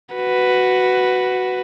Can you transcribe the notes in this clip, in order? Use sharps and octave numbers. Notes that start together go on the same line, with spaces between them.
F#4 B4